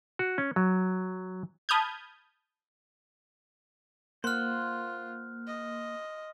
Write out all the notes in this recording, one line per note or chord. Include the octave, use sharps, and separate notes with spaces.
F#4
C#4
F#3
A5 B5 D#6 F6 G6 G#6
A#3 F4 C5 F#5 C6 F6
D#5